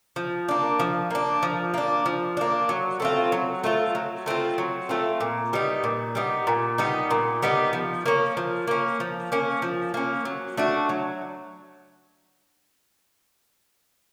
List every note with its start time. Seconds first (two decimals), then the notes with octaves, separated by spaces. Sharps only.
0.16 F3
0.49 A#3 D4
0.80 F3
1.10 A#3 D4
1.43 F3
1.74 A#3 D4
2.06 F3
2.37 A#3 D4
2.69 F#3
3.00 A3 C4 F4
3.32 F#3
3.64 A3 C4 F4
3.95 F#3
4.26 A3 C4 F4
4.58 F#3
4.89 A3 C4 F4
5.20 A#2
5.53 G3 B3 D#4
5.84 A#2
6.15 G3 B3 D#4
6.47 A#2
6.78 G3 B3 D#4
7.11 A#2
7.43 G3 B3 D#4
7.73 F3
8.06 A#3 C#4
8.37 F3
8.67 A#3 C#4
9.00 F3
9.32 A#3 C#4
9.62 F3
9.94 A#3 C#4
10.25 F#3
10.57 A3 D4 F#4
10.89 F#3